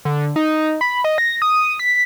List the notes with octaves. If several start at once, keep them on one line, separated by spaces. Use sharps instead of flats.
D3
D#4
B5
D#5
A#6
D#6
B6